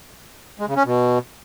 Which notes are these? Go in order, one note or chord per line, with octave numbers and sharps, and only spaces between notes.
G#3
C#3
C#4
B2